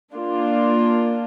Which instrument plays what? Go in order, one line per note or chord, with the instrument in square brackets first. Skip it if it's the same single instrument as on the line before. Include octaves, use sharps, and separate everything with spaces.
[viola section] A#3 D4 F4